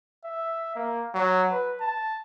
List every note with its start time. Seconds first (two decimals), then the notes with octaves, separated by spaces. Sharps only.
0.25 E5
0.76 A#3
1.14 F#3
1.51 B4
1.81 A5